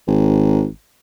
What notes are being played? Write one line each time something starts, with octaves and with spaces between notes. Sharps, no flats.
G#1